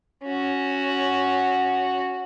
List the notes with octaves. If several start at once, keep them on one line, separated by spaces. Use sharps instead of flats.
C#4 F#4